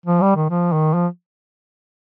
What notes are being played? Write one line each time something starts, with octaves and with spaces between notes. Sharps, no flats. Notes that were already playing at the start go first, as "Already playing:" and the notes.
F3
G3
D#3
F3
D#3
F3